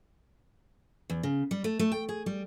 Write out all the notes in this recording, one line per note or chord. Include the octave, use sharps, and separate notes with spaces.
E2
C#3
G3
A3
A3
G5
G#4
G3